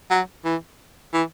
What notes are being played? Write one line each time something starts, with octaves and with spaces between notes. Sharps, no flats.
F#3
E3
E3